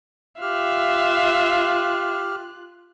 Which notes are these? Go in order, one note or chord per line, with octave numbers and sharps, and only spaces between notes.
F4 G4 E5 F5 F6 F#6